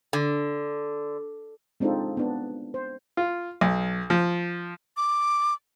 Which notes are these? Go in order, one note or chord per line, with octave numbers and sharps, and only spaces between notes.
D3
G#3 C4 D4 D#4 F4 A4
B3 D4
C5
F4
B1
F3
D6